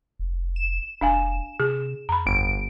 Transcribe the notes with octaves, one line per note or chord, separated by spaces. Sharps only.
F1
E7
F1 D4 F5 G#5
C3 G#4
F2 A#5 B5
G1 D7